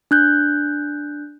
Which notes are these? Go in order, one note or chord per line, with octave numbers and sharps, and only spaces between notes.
D4 F#6 G6